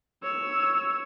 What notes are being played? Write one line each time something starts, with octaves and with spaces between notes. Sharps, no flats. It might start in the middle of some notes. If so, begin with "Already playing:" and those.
C#5 E6